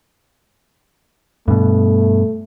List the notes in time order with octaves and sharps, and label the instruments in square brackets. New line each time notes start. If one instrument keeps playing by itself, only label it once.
[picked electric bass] G2 B2 [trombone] A3